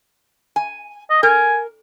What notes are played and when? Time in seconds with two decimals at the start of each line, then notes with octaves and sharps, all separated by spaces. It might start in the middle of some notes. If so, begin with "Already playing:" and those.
0.56 G#5
1.10 D#5
1.23 A#4 G#5